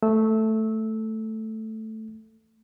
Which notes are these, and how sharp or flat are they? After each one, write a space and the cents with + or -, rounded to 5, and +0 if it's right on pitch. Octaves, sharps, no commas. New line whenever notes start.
A3 +0 E6 -20